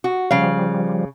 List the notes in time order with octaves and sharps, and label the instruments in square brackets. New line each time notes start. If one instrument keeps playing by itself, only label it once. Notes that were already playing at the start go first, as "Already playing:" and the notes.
[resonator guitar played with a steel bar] F#4
[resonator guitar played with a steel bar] C#3 F5 [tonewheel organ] F3 G3